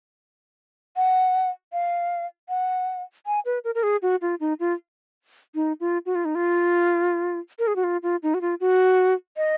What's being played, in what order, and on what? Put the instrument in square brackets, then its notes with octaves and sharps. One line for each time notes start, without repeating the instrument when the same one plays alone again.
[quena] F#5
F5
F#5
G#5
B4
A#4
A#4
G#4
F#4
F4
D#4
F4
D#4
F4
F#4
F4
D#4
F4
A#4
G#4
F#4
F4
F4
D#4
F#4
F4
F#4
D#5